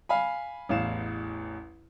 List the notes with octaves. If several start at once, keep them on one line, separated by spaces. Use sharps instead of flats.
F5 G#5 B5
A1 E2 F5 E7